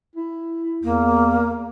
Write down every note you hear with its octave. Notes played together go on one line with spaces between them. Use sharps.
E4
E2 A#3